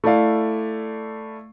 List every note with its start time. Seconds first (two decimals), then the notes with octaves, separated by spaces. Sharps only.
0.04 A3 E4 A4 D5 F5